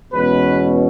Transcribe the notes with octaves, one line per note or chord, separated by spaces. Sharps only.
E2 B2 G#3 C#4 B4